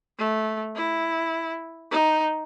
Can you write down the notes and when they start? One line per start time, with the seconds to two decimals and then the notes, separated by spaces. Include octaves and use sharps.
0.19 A3
0.76 E4
1.91 D#4